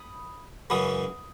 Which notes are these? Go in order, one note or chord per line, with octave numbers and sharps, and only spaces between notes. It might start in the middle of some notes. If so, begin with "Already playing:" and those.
Already playing: B5 D#6
F#2 C#3 E3 G#3 B5 D#6